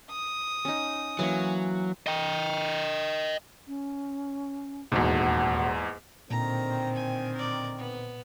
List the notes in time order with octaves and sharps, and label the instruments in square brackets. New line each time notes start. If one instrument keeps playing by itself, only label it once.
[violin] D#6
[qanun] C#4 D#4
[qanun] E3 A#3 C#4 [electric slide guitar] F#3
[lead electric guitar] D#5 G5
[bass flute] C#4
[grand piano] D#1 F#4 [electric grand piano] E2 G#2 [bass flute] F#5
[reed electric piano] A#2 [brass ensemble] D3 D#3 C4 [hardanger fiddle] A#5
[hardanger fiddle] G#5
A#4 D5
B3